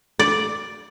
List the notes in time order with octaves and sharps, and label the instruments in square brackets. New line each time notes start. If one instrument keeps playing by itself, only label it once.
[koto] D5